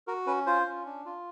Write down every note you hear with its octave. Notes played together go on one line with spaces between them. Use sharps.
F#4 A#4
C#4 B4
F4 C5
C#4
D4
F4